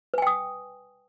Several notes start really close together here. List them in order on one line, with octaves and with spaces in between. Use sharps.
B4 G#5 G5 D#6